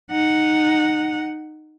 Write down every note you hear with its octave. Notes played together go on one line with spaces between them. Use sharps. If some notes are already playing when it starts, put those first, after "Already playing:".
D#4 F#5